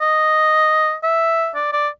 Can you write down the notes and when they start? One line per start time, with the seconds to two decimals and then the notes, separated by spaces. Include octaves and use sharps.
0.01 D#5
1.03 E5
1.55 D5
1.73 D5